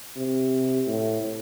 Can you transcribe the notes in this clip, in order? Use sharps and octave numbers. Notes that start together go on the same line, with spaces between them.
C3
A2